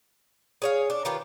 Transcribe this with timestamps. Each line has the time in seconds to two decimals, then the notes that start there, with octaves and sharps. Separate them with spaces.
0.62 G#4 C#5 F5
0.90 D4
1.05 D#3 F4 G4 B4